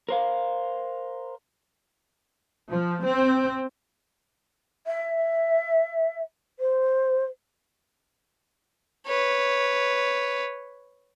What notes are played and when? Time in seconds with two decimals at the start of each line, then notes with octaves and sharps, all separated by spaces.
0.09 A#4 C5 F5
2.70 F3
3.03 C4
4.87 E5
6.59 C5
9.07 B4 C#5